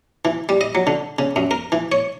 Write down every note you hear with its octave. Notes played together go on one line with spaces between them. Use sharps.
E3
G3
D#5
F#3
D3
C#3
F#2
A#4
E3
C#5